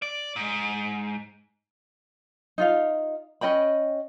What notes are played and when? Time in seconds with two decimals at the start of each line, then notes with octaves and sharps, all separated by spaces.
0.02 D5
0.36 G#2
2.58 D#4 F4 F5
3.41 C#4 D#5 G5 B5